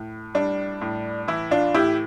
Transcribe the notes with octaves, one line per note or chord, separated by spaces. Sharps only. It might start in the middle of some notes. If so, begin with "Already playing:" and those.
Already playing: A2
G3 D4
A2
E3 E4
D4 F4
A2 E4 G4